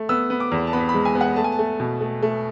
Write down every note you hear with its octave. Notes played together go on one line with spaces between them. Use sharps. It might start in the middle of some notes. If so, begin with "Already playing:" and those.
Already playing: A3
B3 E6
B3
D6
E2
A5
B3 B5
B5
G#3
G#5
B3
F#5
A3 A5
G#5
A5
A3
B2
A3
A3